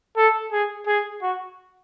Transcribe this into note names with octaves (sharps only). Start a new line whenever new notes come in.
A4
G#4
G#4
F#4